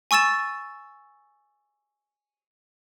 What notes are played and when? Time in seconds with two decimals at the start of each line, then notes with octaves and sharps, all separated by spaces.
0.11 G#5 C#6 E6 A6 E7